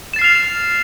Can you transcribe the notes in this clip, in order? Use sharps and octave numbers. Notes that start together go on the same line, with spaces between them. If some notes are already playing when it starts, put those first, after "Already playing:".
F6 A6 C7 E7 F7